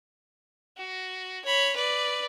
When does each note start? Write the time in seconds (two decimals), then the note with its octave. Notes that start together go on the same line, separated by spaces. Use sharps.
0.78 F#4
1.45 C#5 B5
1.76 B4 D5